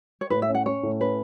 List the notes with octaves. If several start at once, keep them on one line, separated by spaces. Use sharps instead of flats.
C#5
A2 B4
E5
C#4
F#5
C#4 C#5
A2
C#4 B4